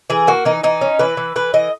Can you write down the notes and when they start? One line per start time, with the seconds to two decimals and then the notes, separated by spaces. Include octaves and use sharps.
0.10 E3 G#4
0.27 A#3 F#4
0.45 E3 D#4
0.63 E3 D#4
0.81 C#4
0.99 E3 B4
1.17 E3
1.36 E3 B4
1.54 E3 D#5